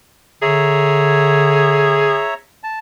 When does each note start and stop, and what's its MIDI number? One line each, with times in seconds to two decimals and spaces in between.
0.42 2.22 50
0.42 2.39 68
0.42 2.34 73
0.42 2.34 76
0.42 2.34 82
2.63 2.79 81